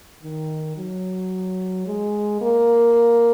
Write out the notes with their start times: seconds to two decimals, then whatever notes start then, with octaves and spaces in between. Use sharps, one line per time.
0.22 D#3
0.77 F#3
1.87 G#3
2.41 A#3